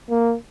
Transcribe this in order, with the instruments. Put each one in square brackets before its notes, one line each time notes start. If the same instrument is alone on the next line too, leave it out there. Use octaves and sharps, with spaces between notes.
[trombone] A#3